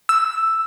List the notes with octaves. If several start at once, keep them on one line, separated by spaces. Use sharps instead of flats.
E6